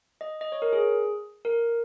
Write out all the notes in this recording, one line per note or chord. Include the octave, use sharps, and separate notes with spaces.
D#5
D#5
C#5
A#4
G#4
A#4